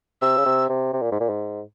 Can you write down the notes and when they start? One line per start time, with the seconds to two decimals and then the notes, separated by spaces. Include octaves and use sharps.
0.22 C3 E6
0.37 C#3
0.45 C3
0.69 C3
0.93 C3
1.02 A#2
1.11 G#2
1.20 A#2
1.29 G#2